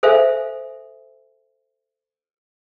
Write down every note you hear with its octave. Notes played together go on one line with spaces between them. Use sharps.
A4 C5 E5 F5 G#5